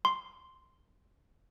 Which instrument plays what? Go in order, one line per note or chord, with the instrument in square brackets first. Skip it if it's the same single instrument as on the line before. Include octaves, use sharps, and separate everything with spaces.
[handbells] C6